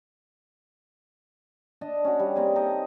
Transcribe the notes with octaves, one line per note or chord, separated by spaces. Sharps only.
D4 D#5 A5
C#4 F#4
G3
A#3 C4 G#4
D#4 G4 A4 D#5